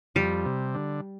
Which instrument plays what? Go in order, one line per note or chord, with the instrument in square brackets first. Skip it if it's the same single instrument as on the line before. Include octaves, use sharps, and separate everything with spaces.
[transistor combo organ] F2 [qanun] G3
[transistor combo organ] C3
D3